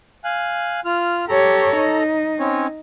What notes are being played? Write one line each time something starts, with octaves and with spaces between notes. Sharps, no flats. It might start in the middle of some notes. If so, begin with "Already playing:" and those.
F5 G#5 F#6
F4 F6
G4 A4 C#5 A#5
D#4
C4 C#4 C#5